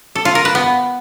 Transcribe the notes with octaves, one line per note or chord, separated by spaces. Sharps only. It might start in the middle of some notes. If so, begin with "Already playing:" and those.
A4
F4
A#4
B4
B3